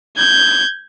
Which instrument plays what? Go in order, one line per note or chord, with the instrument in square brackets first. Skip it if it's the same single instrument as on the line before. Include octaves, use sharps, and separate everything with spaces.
[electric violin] G6 G#6